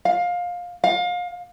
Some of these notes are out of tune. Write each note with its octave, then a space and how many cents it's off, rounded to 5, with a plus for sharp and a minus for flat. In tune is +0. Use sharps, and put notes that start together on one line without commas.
F5 +20
F5 +30